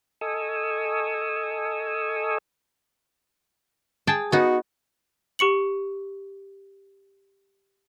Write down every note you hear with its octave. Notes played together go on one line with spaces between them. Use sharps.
A4 D#5 G#5 C#6 D#6 E6
G#4 G5 A5
B3 D#4 F#4
G4 C#6 C#7 F#7